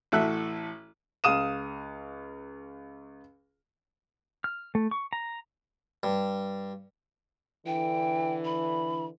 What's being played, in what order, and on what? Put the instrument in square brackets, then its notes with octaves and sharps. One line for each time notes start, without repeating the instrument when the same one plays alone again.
[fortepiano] A1 A2 F#4 A4 E5 F#6
[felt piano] C#2 F5 D#6 D#7 E7
[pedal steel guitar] F6
A3
C#6
A#5
[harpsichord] G2
[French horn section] D3 E3 [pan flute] G5
[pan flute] B5